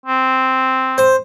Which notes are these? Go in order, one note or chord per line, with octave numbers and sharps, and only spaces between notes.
C4
C5